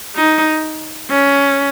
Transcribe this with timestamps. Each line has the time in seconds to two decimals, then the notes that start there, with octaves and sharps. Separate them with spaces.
0.16 D#4
1.10 C#4